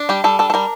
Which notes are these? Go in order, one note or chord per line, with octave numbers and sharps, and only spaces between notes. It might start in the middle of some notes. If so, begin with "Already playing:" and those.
Already playing: D4
G3 G4
G3 A4
D4 A4
A4
G3 A#4